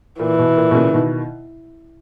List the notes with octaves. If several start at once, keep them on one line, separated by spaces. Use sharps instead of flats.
A#2 E3
B2
A#2
B2
A#2 C#3
B2 D#3